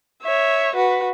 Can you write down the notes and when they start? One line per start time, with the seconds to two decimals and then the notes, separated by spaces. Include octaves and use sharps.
0.23 C#5 E5
0.75 F#4 B4